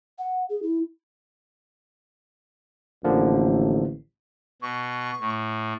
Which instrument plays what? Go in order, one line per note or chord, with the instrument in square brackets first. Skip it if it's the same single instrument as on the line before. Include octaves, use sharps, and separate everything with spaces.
[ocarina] F#5
G#4
E4
[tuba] A1 [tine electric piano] D3 F3 A#3
[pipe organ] B2 [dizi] C#6
[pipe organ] A2